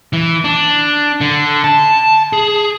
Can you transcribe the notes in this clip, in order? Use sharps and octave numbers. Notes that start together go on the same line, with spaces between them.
E3
D4
D3
A5
G#4